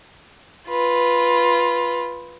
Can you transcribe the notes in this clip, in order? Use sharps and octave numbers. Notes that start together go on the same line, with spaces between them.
F4 B4